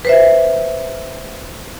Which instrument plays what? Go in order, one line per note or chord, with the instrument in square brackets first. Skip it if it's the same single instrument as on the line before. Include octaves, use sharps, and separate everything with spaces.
[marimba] B4 C5 E5